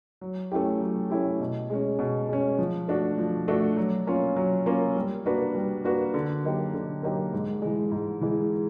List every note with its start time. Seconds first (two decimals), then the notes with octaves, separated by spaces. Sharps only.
0.21 F#3
0.52 A3 C#4 E4 G4
0.81 F#3
1.10 A3 C#4 E4 G4
1.40 B2
1.70 G#3 C#4
1.99 B2
2.29 G#3 C#4
2.59 F3
2.88 A3 D4 F#4
3.18 F3
3.48 A3 D4 F#4
3.77 F#3
4.07 A#3 C#4 F4
4.36 F#3
4.66 A#3 C#4 F4
4.96 G3
5.26 A#3 D4 F#4 B4
5.55 G3
5.84 A#3 D4 F#4 B4
6.14 D3
6.44 F#3 A#3 D#4 G4
6.74 D3
7.03 F#3 A#3 D#4 G4
7.33 G#2
7.62 E3 G#3
7.92 G#2
8.21 E3 G#3